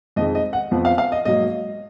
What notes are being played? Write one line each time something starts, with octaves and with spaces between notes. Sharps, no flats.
F2 D#3 G#3 D#5
D#5
F#5
F2 F3 B3
F5
F5
D#5
G#2 F#3 A#3 D#5